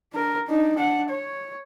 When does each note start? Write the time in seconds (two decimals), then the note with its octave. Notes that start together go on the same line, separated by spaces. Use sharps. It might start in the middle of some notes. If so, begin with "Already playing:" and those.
0.13 D4 A#4
0.47 D4 D#4
0.76 D4 F#5
1.10 C#5